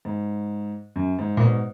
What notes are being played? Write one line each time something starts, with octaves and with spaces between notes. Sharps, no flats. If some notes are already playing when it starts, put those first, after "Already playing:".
G#2
F#2
G#2
A#2
G#2 B2